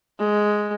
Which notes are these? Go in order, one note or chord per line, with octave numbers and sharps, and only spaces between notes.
G#3